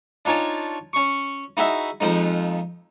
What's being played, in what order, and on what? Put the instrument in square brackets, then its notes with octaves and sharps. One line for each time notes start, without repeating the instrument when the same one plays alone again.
[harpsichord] D4 D#4 F4 C#5 G#5 A5
C#4 C#6
D#4 E4 F#4 G#4 D#5 E5
F2 F3 G#3 D#4